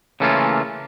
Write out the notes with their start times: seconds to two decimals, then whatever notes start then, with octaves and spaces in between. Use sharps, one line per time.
0.20 C#3 E3 A3 A#3 C#4 F4